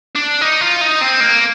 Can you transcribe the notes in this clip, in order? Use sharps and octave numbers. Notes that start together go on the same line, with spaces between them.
D4
D#4
F4
D#4
C4
A#3